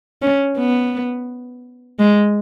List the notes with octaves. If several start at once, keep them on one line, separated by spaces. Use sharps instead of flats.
C#4
B3
G#3